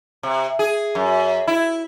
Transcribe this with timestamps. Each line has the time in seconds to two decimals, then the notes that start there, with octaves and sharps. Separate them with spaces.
0.23 C3
0.59 G#4
0.95 F#2
1.47 E4